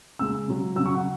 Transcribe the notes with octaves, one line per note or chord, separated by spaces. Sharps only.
C#3 G#3 E6
C#3 F#3
C#3 F#3 E6
C#6
F#5